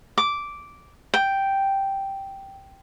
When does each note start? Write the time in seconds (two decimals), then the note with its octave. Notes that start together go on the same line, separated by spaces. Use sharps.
0.18 D6
1.14 G5